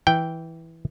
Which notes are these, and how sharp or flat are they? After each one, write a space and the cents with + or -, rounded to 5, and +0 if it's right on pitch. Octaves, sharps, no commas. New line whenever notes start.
E3 -5 G5 +0